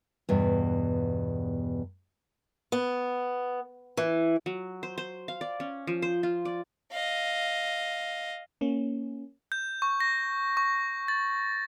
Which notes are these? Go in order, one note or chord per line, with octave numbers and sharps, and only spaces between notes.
E2 G2 B2
B3
E3
F#3
C5
C5
F5
D5
C#4
F3
C5
F4
D5
D#5 F5
A#3 C#4
G6
C#6
A#6
C#6
A6